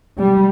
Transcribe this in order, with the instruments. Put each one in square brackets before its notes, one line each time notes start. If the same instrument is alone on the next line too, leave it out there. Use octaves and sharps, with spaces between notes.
[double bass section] G3